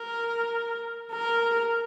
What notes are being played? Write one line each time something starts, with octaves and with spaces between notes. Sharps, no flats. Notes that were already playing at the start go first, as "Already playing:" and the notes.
Already playing: A#4
A#4